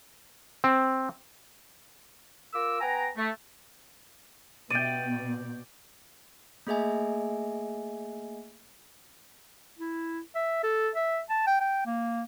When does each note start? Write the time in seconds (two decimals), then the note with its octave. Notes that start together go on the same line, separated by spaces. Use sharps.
0.64 C4
2.54 F4 A#4 D6 E6
2.81 B3 G5 G#5 A#5
3.17 A3
4.70 B2 D5 G5 A6 D7 D#7
6.67 A3 A#3 G#4 D#5 E5 G#5
9.79 E4
10.35 E5
10.63 A4
10.95 E5
11.30 A5
11.47 G5
11.61 G5
11.86 A#3